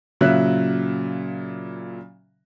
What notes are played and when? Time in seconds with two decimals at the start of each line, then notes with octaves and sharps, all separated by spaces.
0.21 A#2 C#3 F#3 E5 F#6